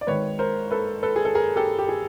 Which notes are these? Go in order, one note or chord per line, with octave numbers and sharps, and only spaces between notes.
D5
G#1 G#2 D#3 B4 C#5
A#4 C5
A4 B4
A4 B4
G#4
A4
G#4 A#4
G4 A4
G4
G#4